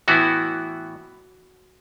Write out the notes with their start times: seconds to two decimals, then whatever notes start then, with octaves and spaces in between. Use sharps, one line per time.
0.08 A2 E3 B3 E4 F#4